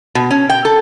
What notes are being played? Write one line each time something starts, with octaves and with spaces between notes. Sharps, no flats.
B2
C#4
G5
A4